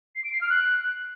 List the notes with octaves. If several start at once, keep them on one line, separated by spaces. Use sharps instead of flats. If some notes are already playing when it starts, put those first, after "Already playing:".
C7
D7
C7
F6
F#6